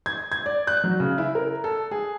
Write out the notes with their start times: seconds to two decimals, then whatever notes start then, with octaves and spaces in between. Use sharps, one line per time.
0.06 G#6
0.32 G#6
0.46 D5
0.67 F#6
0.84 F#3
1.00 C#3
1.18 E4
1.35 A#4
1.64 A4
1.91 G#4